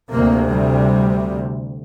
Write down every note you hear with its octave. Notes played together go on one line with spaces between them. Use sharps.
D2 C3 A#3
G3